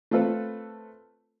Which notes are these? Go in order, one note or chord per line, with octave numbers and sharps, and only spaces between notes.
A3 C4 F4 A4 B4